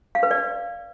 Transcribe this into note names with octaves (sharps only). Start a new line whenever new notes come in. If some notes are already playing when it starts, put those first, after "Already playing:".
F5
B4
D5